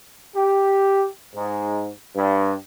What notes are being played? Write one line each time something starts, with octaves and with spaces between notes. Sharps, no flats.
G4
G#2
G2